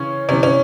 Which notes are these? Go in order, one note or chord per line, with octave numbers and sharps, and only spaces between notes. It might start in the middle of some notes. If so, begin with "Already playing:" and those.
Already playing: C#3 E3 C#4
C3 E3 C#4
C#4